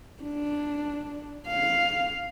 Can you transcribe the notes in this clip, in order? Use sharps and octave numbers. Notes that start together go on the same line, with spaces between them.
D4
F5